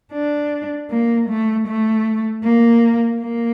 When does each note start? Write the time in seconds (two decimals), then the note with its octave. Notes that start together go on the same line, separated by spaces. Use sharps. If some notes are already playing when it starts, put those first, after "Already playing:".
0.12 D4
0.90 A#3
1.29 A3
1.68 A3
2.44 A#3
3.21 A#3